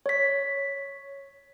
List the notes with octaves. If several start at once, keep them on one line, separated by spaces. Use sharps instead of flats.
C#5 B6